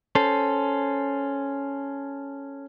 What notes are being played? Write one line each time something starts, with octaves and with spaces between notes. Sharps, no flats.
C#4 A4 C5